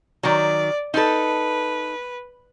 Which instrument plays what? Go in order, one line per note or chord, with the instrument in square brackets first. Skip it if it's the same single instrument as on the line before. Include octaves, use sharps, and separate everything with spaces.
[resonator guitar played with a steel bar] D#3 F#3 [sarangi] D5
[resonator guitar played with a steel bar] D#4 A4 [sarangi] B4